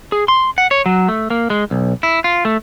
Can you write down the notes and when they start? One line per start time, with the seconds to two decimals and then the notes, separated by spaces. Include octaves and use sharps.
0.12 G#4
0.28 C6
0.58 F#5
0.71 C#5
0.86 F#3
1.08 A3
1.30 A#3
1.50 G#3
1.71 B1
2.03 E4
2.24 F4
2.45 A3